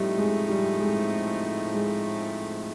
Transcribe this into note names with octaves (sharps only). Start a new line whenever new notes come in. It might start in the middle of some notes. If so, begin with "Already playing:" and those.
Already playing: A2 F3 G3 A3 C4 D#4
G#3
G3
G#3
G#3